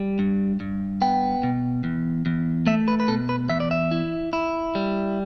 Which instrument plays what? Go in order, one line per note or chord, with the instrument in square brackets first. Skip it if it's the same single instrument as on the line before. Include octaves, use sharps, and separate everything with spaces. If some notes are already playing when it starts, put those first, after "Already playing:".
Already playing: [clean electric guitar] G3
G2
G2
B3 G5
B2
E2
E2
A3 E5
B4
B4
B2 A4
B4
E2 E5
D5
E5
E4
E4
G3